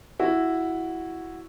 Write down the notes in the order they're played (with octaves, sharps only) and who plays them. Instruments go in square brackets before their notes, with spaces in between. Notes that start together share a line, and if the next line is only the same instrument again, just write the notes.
[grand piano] E4 F#4